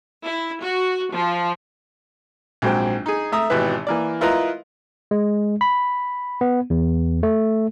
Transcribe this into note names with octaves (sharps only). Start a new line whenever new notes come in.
E4
F#4
F3
A#1 G#2 F#3 C4 G5
D#4 G#4
A3 E5 A#5 D#6
G#1 B2 E3 G4 B4 E5
E3 A#3 D5
E4 F4 A#4 B4 D#5 A#5
G#3
B5
B3
E2
A3